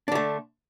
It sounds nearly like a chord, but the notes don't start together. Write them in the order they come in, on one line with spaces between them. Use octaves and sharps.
D4 D3 A3